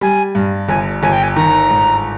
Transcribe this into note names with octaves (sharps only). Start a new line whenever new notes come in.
G3 G#5
G2
G1 G#5
G1 G#5
G5
G#5
D#3 A#5
G#2